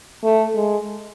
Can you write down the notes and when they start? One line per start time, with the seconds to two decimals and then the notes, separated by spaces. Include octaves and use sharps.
0.23 A3
0.55 G#3